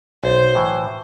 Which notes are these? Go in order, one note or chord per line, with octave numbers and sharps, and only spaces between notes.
B1 C5
A2 E3